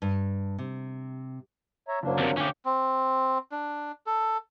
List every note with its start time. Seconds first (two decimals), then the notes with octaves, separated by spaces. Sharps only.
0.02 G2
0.59 C3
1.88 C#5 E5 A#5
2.03 F#1 F#3 A#3 D4 C5
2.18 G1 D#2 C3 C4 A#4
2.37 D2 C3 C#4 G4 C#5 F5
2.65 C4
3.52 D4
4.06 A4